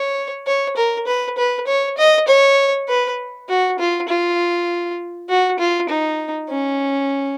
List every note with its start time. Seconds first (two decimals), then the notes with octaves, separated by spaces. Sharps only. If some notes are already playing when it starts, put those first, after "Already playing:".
Already playing: C#5
0.47 C#5
0.77 A#4
1.07 B4
1.38 B4
1.67 C#5
1.98 D#5
2.28 C#5
2.89 B4
3.49 F#4
3.79 F4
4.09 F4
5.29 F#4
5.59 F4
5.89 D#4
6.49 C#4